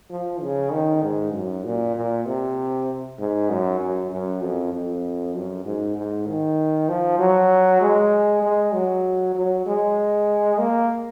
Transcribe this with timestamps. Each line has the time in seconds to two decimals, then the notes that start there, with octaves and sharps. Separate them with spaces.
0.10 F3
0.41 C#3
0.72 D#3
1.03 G#2
1.34 F#2
1.65 A#2
1.95 A#2
2.26 C3
3.19 G#2
3.50 F#2
3.80 F#2
4.11 F#2
4.42 F2
4.73 F2
5.34 F#2
5.65 G#2
5.96 G#2
6.27 D#3
6.89 F3
7.19 F#3
7.81 G#3
8.43 G#3
8.73 F#3
9.35 F#3
9.66 G#3
10.58 A#3